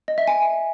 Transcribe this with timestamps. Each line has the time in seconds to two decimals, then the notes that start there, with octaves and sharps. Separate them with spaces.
0.08 D#5
0.18 E5
0.27 G#5